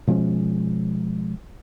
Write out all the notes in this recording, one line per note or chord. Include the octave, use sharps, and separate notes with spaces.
B2 F3 G#3 C#4